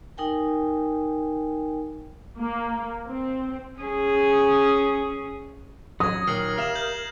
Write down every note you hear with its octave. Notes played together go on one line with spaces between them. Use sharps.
D#4 A#4 G5 G#5
A#3
C4
C#4 G#4
F#3 D#6 G#6 A#6
A#2 D#3 F#3 A#4 F6 C7 F#7
G4 E5 F5 F6 E7 F#7
G6 F#7